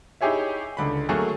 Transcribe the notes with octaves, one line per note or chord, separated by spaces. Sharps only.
D#4 E4 G4 G#4 C#5 E5
C#2 D3 B5
F#3 A3 A#3 F#4 G#4 A#4